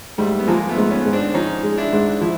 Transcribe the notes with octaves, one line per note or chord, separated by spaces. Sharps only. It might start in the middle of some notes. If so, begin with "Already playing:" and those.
G#2 G3 A3
B3
F3 G#3 A#3
A3 B3
G#2
B3 C#4
G#2
C4 D4
F3 C#4 D#4
G#3
D4 E4
G#2
F3 E4